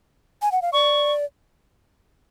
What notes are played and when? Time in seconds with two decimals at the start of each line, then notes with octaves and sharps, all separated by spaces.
0.42 G#5
0.52 F#5
0.62 F5
0.73 D5 C#6